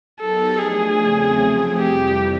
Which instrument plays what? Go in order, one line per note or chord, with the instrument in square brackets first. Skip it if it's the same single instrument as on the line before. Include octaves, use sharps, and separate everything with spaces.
[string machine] F#3 B3 D#4 G4 A#4 [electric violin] A4
[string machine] F3 A3 D4 [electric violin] G#4
[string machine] E2 C#3 F#3 A3 C4
C3 F3 A3 C4
[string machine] F2 C3 E3 G3 [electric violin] G4